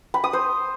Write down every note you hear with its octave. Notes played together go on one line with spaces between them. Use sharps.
B5
D#6
C5